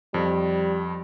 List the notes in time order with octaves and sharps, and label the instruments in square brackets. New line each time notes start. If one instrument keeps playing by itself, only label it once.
[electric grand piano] F2 F3 [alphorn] G3